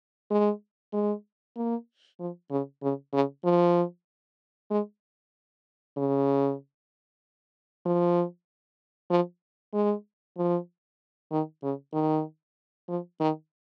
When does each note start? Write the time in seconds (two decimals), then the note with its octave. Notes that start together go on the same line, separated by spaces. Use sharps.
0.31 G#3
0.93 G#3
1.56 A#3
2.20 F3
2.51 C#3
2.82 C#3
3.13 C#3
3.45 F3
4.70 G#3
5.97 C#3
7.86 F3
9.10 F3
9.74 G#3
10.37 F3
11.31 D#3
11.63 C#3
11.93 D#3
12.89 F3
13.20 D#3